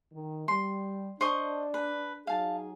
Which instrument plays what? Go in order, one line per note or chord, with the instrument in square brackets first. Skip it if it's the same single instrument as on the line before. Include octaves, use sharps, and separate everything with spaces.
[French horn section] D#3
[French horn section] G3 [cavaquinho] C6
[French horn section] D4 [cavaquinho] C5 D#5 C#6
[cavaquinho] B4
[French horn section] F#3 D#4 G#4 [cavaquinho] F5 A5